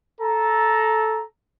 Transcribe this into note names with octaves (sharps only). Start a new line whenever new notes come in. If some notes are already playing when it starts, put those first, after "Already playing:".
A4 A#5